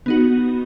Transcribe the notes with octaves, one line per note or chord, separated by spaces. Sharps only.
B3 D#4 F#4